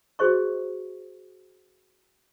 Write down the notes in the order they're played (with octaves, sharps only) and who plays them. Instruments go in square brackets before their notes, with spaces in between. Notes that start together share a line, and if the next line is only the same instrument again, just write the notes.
[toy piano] F#4 G#4 C5 D#5 C#6